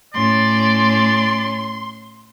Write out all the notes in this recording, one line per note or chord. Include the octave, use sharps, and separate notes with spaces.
A2 C#4 D5 C6